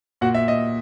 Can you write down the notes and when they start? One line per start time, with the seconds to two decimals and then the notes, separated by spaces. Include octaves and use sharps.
0.21 A#2 F#4 F#5
0.34 E5
0.48 D#5